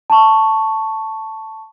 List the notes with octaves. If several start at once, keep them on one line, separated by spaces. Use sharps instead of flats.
A5 C#6